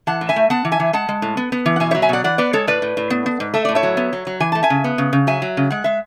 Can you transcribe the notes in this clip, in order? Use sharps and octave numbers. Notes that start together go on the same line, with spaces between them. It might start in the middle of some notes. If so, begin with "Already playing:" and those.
E3 F#5 A5
A2
E5 G#5
A3
B3 F#5 A5
E3
E5 G#5
E3
G#3 F#5 A5
G#3
A2
B3
B3
E3
F#5
B2 E5 G#5
C#5 E5
F#3
E5 G#5
B2 D5 F#5
E3 D5 F#5
B3 B4 D5
G#3 A4 C#5
A2 B4 D5
A2
A2
B3
B3
G#2
A3 E5
A2 D5
C#5 E5
F#3
B3
F#3
F#3
E3 G#5
A3 A5
E5 G#5
C#3
B3
C#3
C#3
F#3 E5 G#5
F#3
C#3
G#3 F#5
G#3 E5